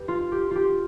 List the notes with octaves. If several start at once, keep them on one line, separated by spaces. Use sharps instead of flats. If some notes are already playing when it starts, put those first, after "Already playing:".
Already playing: G4 B4
F4
G4
F4 G4